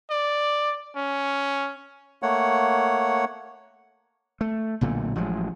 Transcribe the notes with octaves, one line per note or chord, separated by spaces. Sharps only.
D5
C#4
A3 A#3 C#5 F#5
A3
B1 A#2 D3 A3
A1 F3 F#3 G#3